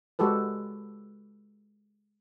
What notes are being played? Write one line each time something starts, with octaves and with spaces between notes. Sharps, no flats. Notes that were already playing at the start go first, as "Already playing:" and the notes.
G#3 F#4 G4 A4 B4